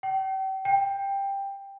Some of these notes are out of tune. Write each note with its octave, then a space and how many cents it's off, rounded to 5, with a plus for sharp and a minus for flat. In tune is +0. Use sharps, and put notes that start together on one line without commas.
G5 -40
G5 +10